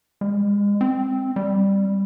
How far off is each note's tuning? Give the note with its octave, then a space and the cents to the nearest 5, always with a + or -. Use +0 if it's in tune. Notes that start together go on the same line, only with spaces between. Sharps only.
G#3 -35
C4 +0
G3 +10